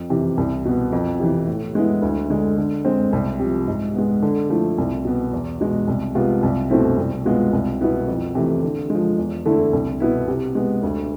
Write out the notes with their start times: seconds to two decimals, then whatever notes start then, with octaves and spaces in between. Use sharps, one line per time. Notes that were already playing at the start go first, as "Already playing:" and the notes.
Already playing: F2
0.10 C3 E3
0.37 C2
0.65 B2 B3
0.92 F2
1.20 C3 E3
1.48 A2
1.75 G#3 B3 E4
2.02 D2
2.30 D3 G#3
2.57 D3
2.85 G#3 C4
3.13 C2
3.39 C3 F3
3.68 G#2
3.95 G#3 B3
4.22 D3
4.50 F3 A3 E4
4.78 C2
5.05 B2 B3
5.33 E2
5.61 B2 G#3
5.88 C2
6.15 C3 G#3 B3 F4
6.43 C2
6.70 B2 A3 C4 E4
6.97 C2
7.25 B2 G#3 B3 F4
7.53 C2
7.81 B2 B3 E4
8.08 F2
8.35 C3 E3 A3
8.63 D3
8.90 F3 G#3
9.18 E2
9.46 D3 A3 E4
9.73 C2
10.00 B2 B3 E4
10.28 C3
10.55 G#3 B3
10.83 D2